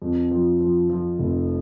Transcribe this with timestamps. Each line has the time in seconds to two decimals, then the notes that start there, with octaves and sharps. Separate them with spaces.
0.02 F2
0.31 F3
0.60 F3
0.90 F3
1.19 F1